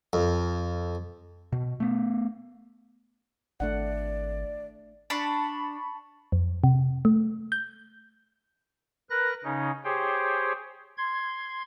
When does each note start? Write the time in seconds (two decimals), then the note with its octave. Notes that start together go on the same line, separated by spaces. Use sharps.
0.13 F2
1.53 B2
1.80 A3 B3
3.60 G#1 A3 D4 D5 F#5
5.10 D4 A5 B5 C#6
6.32 F2
6.64 C3
7.05 A3
7.52 G6
9.10 A#4 B4 F#6 A#6
9.44 C#3 C#4 D#4
9.84 G4 G#4 C5 C#5 G5
10.98 C6 G#6